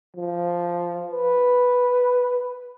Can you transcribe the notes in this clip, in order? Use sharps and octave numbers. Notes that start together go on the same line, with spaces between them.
F3
B4